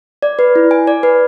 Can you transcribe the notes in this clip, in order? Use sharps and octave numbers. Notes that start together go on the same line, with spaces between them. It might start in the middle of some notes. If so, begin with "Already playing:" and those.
D5
B4
E4
G#5
D5
B4